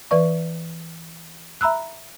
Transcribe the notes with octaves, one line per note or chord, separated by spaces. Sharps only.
E3 B4 D5 C#6
E5 A#5 B5 E6 F#6